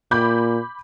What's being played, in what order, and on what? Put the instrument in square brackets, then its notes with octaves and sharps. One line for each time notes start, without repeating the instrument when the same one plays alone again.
[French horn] A#2 [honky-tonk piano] B5 D6 G6